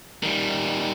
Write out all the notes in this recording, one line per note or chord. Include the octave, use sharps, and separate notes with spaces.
D#3 G3